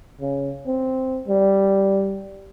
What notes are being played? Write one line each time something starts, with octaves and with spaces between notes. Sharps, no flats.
C#3
C4
G3